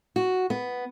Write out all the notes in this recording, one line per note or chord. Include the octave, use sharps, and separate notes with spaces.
F#4
B3